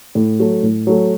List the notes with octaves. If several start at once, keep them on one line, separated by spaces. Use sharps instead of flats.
A2
F#3 A3
A2
F#3 A3